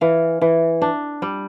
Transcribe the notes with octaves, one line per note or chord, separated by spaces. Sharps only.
E3 F5
E3
D4
G3